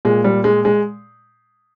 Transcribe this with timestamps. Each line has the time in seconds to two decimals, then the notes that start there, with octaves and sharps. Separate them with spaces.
0.05 A#2 G#3
0.24 G3
0.44 G#3
0.65 G#3